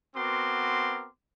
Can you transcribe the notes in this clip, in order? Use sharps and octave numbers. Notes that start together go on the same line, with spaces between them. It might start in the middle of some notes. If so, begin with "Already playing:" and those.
B3 C4 F#4 A#4 C6 D6